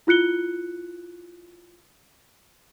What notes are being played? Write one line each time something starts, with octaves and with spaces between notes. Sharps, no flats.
E4 F4 F#6 C#7 G7